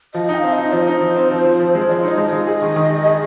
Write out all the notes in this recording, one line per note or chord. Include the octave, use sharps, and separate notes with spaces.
F3 D#5
D#4
G#5
F5
C4
D#5
D#4
F3 C5
D#4
F3
C4
F3
F3
F3
G#3
F3 C5 D#5
D#4
D#5
G#3
D#5
G#3
G#4
D#3
D#3
G#4
G#4